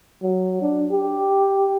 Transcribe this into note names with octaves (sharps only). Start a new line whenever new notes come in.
F#3
D4
G4